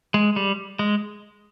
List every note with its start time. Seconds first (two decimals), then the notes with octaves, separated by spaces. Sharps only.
0.14 G#3
0.36 G3
0.79 G#3